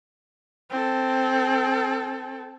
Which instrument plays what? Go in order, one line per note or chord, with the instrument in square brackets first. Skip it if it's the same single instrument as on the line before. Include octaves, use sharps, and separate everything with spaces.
[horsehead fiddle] C4 A4